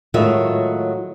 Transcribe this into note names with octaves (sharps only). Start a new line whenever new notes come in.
A2 D#3 F#3 G#3 F4 E5